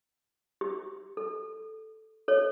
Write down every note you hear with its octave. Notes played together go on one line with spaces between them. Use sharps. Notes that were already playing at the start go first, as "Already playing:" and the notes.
G4
A4
A4 C#5